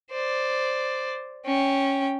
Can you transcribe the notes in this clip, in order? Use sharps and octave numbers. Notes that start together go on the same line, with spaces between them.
C5 D5
C#4 G5